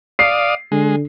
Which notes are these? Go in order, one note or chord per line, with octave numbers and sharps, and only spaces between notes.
D5 F5 D#6 C7
D3 G#3